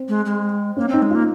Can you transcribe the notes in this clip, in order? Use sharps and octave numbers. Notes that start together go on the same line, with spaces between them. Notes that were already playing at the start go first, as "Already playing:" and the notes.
Already playing: C4
G#3
G#3
A#3 C#4
C4 D#4
G#3
A#3 F4